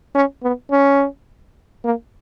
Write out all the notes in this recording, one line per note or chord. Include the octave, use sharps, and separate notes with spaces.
C#4
B3
C#4
A#3